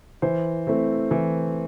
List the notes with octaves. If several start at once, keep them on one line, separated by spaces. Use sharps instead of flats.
E3 C5
A3 C4 E4
E3